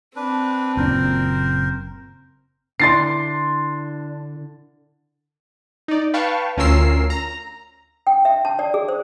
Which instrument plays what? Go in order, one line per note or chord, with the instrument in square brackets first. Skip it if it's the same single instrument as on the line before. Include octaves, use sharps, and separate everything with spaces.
[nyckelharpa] C4 [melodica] D4 B4
[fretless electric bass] F#1 A#2 D4 [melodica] A#4 C5
[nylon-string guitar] D3 E4 D5 [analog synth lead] D4 [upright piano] C6 A6 C7
[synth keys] D#4 D5
B4 F5 G5 A5 C#6
D2 C#4 F4 A#4 E6 C7
A#5
[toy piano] G5
E5
A5
D5
G#4
C5